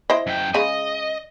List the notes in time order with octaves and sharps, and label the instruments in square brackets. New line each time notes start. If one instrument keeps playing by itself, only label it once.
[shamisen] E4 C5 D#5
[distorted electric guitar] F#2 G5
[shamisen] C#3 G#3 [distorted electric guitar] D#5